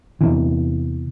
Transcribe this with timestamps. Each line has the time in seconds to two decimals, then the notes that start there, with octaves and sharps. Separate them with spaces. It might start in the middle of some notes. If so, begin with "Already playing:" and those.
0.21 E2 C3 E3